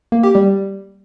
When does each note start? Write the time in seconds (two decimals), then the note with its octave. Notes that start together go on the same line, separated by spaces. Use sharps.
0.12 A#3
0.23 G4
0.35 G3